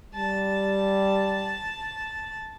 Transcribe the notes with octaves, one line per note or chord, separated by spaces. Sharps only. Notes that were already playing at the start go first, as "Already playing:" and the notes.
G3 A5